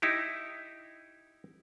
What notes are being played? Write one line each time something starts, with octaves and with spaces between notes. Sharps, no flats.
D#4 E4 G4